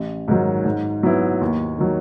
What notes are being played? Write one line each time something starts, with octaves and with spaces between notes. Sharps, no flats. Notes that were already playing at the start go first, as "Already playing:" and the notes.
Already playing: A1
G#2 D#3 F#3
G#2
F#3 B3 E4
D#2
D#3 F#3